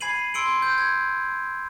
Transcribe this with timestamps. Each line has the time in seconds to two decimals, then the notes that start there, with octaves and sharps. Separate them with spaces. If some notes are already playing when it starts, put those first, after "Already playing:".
0.01 G#5 B5 G#6 C7 D#7 F#7
0.34 C6 E6 C#7 D7 F#7
0.62 G6
0.78 G#6